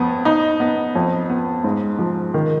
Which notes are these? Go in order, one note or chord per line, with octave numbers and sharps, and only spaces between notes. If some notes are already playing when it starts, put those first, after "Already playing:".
Already playing: F2 B3
D#4
B3
F2
B3
G#2
F3
D#3